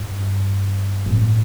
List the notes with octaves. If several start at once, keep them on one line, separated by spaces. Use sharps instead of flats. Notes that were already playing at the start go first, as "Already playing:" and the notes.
Already playing: G2
A2